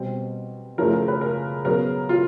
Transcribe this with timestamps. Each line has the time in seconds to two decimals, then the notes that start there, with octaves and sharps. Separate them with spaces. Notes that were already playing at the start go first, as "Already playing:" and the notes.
Already playing: B2 G3 C4
0.78 F#2 C#3 F3 A3 A#4
0.93 A#4
1.08 B4
1.21 A#4
1.65 C#3 F#3 B3 A#4
2.09 F4